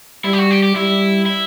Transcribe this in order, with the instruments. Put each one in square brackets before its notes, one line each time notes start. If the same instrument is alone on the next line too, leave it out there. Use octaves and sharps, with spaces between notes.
[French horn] G3 [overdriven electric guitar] E4
[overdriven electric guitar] G4
F#4
G4
G4
[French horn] G3 [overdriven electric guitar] E4
[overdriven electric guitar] E4